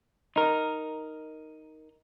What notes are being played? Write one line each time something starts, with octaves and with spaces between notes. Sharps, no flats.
D#4 A#4